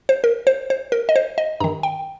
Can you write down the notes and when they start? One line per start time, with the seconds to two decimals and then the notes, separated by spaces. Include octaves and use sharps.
0.09 C5
0.24 A#4
0.47 C5
0.70 C5
0.92 A#4
1.09 D#5
1.16 C5
1.38 D#5
1.60 G2 D#3 A#5
1.83 G5